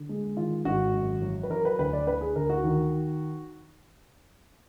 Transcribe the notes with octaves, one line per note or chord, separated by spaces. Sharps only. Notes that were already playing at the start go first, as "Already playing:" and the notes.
Already playing: D3
G#3
D#3 F4
G#1 F#4
F#2
F#3
B4
F#3 A#4
B4
D2 B4
D5
D3 B4
G#4
D2 A#4
F#4
D#3